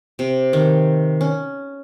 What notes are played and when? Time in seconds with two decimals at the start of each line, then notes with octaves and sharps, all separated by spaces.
0.19 C3
0.53 D#3
1.21 C#4